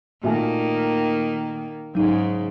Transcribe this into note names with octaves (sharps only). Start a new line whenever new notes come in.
A#2 D#3 A3 A#3 F#4 E5 G#5
G#2 C#3 F#3 D#4